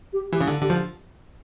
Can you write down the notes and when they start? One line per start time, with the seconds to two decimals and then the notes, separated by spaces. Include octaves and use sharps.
0.13 G4
0.32 E3 G4
0.41 C#3
0.47 D3
0.62 D3 G4
0.70 F3